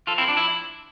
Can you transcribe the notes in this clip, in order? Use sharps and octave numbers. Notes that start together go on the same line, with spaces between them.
F3 F4 A4
C4 E4
F3
D4
E4